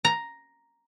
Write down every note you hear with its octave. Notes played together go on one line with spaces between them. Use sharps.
A#5